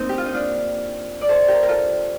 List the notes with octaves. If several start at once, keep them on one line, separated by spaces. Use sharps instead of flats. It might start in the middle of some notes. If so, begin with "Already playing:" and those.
Already playing: A#3 C4 D#4
G4
F4
D#4
D4 F4
D5
A4 C5
G4 A#4
A#4
F4 A4